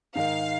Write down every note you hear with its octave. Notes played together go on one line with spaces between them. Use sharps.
G#2 D#3 G#3 D#4 A#4 F5